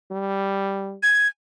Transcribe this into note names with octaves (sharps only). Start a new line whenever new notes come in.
G3
G#6